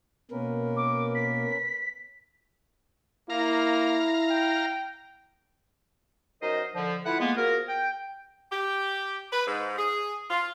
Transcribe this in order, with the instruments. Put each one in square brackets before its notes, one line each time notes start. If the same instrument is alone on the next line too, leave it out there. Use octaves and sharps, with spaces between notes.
[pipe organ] B2 A#3 [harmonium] C#4 A#4 B4
[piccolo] D6
B6
[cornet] A#3 [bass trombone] E4 [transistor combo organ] F5 A#5
[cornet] G5
[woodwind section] F#2 D#4 A#4 C5 D#5
D3 F3
A3 E4 F4 B4 F#5
G#3 A#3 B3
F3 F#4 G#4 A#4
G5
[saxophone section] G4
B4
G#2
G#4
F4